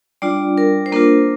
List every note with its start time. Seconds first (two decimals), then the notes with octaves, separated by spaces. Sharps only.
0.22 G3 D4 F4 D5
0.58 A#4
0.86 C5
0.92 A#3 D4 F4 A#4